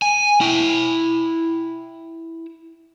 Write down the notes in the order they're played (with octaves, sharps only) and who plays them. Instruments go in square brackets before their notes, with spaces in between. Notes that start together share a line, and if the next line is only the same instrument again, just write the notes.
[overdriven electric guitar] G#5
E4 G5